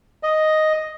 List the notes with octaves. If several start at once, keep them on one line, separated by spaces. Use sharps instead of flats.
D#5